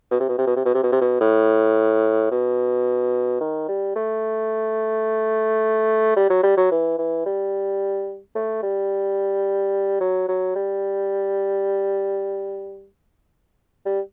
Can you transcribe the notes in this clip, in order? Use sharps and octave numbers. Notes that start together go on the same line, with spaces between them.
B2
C3
B2
C3
B2
C3
B2
C3
B2
C3
B2
A2
B2
D#3
G3
A3
G3
F#3
G3
F#3
E3
E3
G3
A3
G3
F#3
F#3
G3
G3